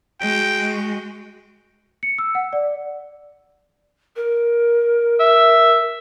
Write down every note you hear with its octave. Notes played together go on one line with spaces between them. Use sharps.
G#3 F#4 G5
C#7
E6
F#5
D5
A#4
E5